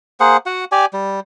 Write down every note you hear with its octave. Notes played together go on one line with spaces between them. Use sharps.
A#3 G#4 C5 F#5
F#4 F#5
G4 D5 G#5
G3